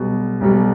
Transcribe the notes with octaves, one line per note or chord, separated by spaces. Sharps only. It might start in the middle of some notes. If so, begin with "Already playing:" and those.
Already playing: B1 B2 G3
B1 B2 G3